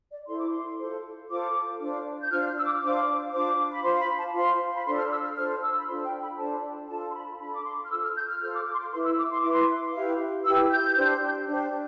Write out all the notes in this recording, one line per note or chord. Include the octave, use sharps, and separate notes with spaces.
D5
E4 A4 C5 C6
D6
C6
F4 A4 C5
F4 A4 C5 D6
D4 F4 C5
G6
D4 F4 C5 F6
E6
D6
D4 F4 C5 D6
D4 F4 C5 D6
B5
F4 C5 C6
B5
A5
F4 C5 C6
B5
D4 F4 A4 C5 C6
F6
E6
F6
D4 F4 A4 C5 F6
E6
B5
D4 F4 A4 C5 C6
G5
B5
D4 F4 A4 C5 A5
D4 F4 A4 A5
C6
B5
D4 F4 A4 B5
D6
C6
F6
F4 A4 C5 E6
F6
G6
F6
F4 A4 C5 F6
D6
D6
C6
D6
E4 B4 C6
E6
D6
C6
E4 B4 D6
C6
E4 G4 B4 F5
E4 G4 B4 E6
G6
D4 G4 C5
D4 G4 C5